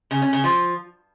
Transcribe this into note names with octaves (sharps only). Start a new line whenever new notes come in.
C#3
C#4
C#3
F3